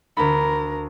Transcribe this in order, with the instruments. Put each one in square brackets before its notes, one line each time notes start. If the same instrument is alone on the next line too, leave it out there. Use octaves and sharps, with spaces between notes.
[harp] D2 B5 [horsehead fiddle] A#4